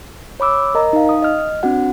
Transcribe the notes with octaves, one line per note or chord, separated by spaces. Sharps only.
C#5 B5 D6 E6
A#4 D#5 A#5
D#4 F5
D#6
D#5 F6
C4 D4 F#4 F#5